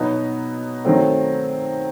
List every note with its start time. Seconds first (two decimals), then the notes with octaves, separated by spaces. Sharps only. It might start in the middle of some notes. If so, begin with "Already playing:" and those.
Already playing: B2 F#3 B3 D#4
0.85 D#3 F#3 A3 C4